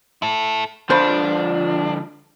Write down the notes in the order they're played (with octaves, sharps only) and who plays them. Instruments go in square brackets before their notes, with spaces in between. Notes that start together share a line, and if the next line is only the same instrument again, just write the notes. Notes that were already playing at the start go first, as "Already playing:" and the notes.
[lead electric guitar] E4 A4
[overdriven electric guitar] D3 F3 [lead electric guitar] D4 [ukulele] F4 C5 B5